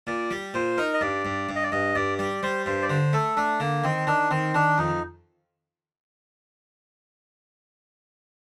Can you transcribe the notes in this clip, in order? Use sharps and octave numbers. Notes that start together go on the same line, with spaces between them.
A#2 D5
G3
A#2 C5
D#4 A#4
D#5
G2 D5
G2
G2
D#5
D5
G2 D#5
G2 D5
G3 D5
G3 C5
G2 C5
D5
D3 C5
A3 A4
A3 D4
D3 A#3
D#3 C4
D#3 D4
D#3 C4
D#3 D4
F2 D#4